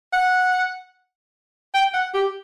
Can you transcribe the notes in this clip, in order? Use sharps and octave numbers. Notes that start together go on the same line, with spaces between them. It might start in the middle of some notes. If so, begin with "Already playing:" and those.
F#5
G5
F#5
G4